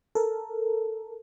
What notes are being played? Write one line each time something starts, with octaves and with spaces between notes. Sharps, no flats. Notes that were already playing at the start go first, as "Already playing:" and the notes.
A4 A#4